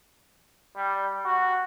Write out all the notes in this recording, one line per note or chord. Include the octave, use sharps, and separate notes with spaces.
G3
F#4